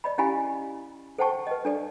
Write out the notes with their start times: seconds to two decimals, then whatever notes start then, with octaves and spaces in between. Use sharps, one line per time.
0.04 D5 D#5 B5
0.18 C#4 E4 G4 F5 G#5 B5
1.18 A4 C5 F#5 G5 A5 C#6
1.47 B4 D#5
1.65 D4 A4 D5